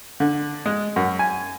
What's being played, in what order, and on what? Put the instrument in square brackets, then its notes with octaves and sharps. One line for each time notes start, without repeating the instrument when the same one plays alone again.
[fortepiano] D3
G#3
F#2
G#5